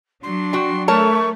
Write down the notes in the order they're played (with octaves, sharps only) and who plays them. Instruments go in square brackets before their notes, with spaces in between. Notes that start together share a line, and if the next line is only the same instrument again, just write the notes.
[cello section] F#3 D4 [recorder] C6
[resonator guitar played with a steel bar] F#4 G5
[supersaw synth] A3 [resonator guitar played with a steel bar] A#4 C#5 A5 [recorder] C#6